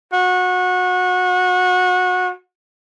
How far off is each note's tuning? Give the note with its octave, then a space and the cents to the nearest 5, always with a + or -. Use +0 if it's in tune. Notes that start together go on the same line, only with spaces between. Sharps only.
F#4 -25